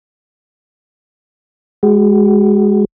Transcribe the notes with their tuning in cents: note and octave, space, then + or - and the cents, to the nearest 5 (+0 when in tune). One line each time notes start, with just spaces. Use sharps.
G#3 +0 F#4 +30